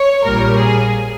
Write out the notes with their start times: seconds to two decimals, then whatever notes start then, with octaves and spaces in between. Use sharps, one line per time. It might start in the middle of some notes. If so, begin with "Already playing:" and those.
Already playing: C#5
0.24 A#1 A#2 G3 A#4
0.57 G#4